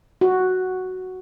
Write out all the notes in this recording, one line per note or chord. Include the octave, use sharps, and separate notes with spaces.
F#4